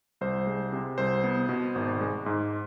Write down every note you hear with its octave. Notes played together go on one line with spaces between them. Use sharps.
C2 C5
G#3
C3
C2 C5
B3
B2
G#1
G#3
G#2